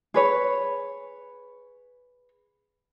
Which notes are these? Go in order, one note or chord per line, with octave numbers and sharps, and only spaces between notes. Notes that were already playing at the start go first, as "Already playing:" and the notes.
G#4 B4 C#5